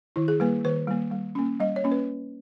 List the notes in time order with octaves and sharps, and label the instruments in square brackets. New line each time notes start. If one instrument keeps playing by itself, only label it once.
[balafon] D#3 E4
G#4
G3 A#3 B4
D#3 B4
G3 A#3
G3
A#3 C#4
G3 D#5
C#5
A#3 C#4
B4